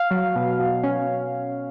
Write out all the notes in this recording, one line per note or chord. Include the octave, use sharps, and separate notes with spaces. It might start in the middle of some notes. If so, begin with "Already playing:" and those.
Already playing: F5
F#3
B2
B2
C#4